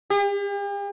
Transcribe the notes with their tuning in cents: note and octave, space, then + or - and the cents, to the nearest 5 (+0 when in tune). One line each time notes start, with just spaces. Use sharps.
G4 +45